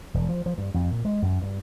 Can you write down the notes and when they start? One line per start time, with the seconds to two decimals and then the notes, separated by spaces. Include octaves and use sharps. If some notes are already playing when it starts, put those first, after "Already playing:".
0.14 E1
0.29 F3
0.46 F3
0.58 G2
0.74 F2
0.91 A#2
1.05 G#3
1.22 F#2
1.42 G2